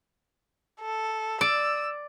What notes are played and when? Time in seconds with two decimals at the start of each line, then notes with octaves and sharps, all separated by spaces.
0.81 A4
1.41 D5 E6